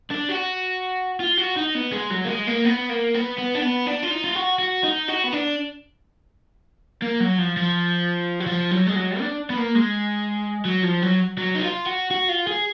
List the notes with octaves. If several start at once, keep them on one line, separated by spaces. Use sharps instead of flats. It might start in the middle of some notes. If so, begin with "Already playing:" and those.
D4
F#4
F4
F#4
D#4
B3
G#3
F#3
A#3
G#3
A#3
B3
A#3
B3
B3
D4
B3
D4
F4
D#4
F4
F#4
F#4
D#4
F#4
B3
D4
A#3
F#3
F3
F3
F#3
F3
F#3
G#3
F#3
D4
B3
A#3
G#3
F#3
F3
F#3
F#3
D#4
F4
F#4
F#4
F4
G#4